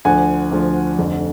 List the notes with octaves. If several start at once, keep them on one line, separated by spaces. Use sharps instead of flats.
D2 D3 F3 F#5 G#5
D2 D3 F3
F1 F2 D3